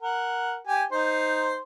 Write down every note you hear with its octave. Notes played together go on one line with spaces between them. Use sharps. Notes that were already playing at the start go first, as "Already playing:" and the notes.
A#4 F#5
G4 G#5
D#4 C5